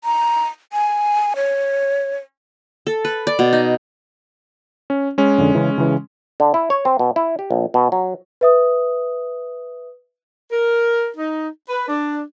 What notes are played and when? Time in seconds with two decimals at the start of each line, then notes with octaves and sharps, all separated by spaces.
0.04 A#5
0.73 G#5
1.36 C#5
2.87 A4
3.05 B4
3.27 D5
3.39 B2
3.53 D#4
4.90 C#4
5.18 G#3 C#4
5.38 F2 D3
5.55 C#3 E3
5.78 C#3 E3
6.40 D3
6.54 E4
6.70 C#5
6.85 C4
6.99 B2
7.16 E4
7.39 G4
7.51 A#1
7.74 B2
7.92 F#3
8.41 B4 E5 D#6
10.52 A#4
11.16 D#4
11.69 B4
11.88 D4